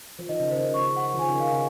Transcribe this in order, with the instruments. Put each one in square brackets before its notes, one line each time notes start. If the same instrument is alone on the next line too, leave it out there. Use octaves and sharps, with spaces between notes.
[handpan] F3
[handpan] D#3 [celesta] D#5
[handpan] C#3
[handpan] C#3 [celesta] C5
[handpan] C#3
[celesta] C#6
F#5
[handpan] F3
[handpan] D#3 [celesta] G#5
[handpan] C#3
[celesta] F5
[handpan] C#3